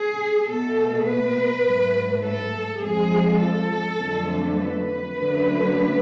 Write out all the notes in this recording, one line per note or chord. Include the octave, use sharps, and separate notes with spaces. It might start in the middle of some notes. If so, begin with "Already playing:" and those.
Already playing: G#4
B2 A3 A4
B4
G#2 F#3 A3
A4
F2 F3 G#3 G#4
A4
F2 D3 F#3 A3
B4
F#2 D3 F#3 A3